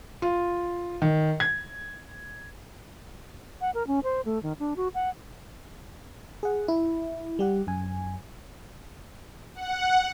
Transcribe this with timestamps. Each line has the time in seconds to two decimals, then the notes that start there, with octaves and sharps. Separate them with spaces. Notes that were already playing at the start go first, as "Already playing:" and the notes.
0.22 F4
1.02 D#3
1.40 G#6
3.61 F#5
3.74 A#4
3.87 C#4
4.04 C5
4.25 A3
4.43 D#3
4.59 D4
4.77 F#4
4.95 F#5
6.43 G#4 F#5
6.68 E4
7.39 G3 G4 F#5
7.67 F#2 G#5
9.55 F#5